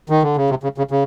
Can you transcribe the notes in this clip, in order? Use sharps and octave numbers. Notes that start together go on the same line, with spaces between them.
D#3
D3
C#3
C3
C#3
C#3
C#3